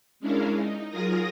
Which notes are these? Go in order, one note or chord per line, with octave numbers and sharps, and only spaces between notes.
G#3 C#4 D4 E4 A#4 F5
D#4
F#3 F4 G#4 A#4 D#6 A#6